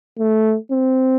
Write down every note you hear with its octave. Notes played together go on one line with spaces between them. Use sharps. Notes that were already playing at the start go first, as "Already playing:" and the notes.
A3
C4